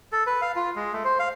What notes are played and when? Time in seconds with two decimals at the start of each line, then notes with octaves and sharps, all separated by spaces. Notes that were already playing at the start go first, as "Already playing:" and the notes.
0.12 A4
0.27 B4
0.41 F5
0.56 F4
0.76 G#3
0.93 A3
1.04 C5
1.19 F5